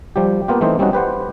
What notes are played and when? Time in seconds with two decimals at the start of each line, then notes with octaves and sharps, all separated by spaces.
0.16 F3 G3 G4
0.48 A#3 B3 F4 G4
0.61 E3 A3 C4 D#4 C5
0.79 G3 C4 C#4 D#4 F#4
0.93 G4 B4 C5 F#5